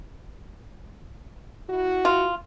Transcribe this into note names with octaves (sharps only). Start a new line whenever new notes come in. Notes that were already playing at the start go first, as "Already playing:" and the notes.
E4 F#4
F4